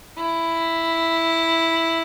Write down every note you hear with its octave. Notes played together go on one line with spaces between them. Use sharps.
E4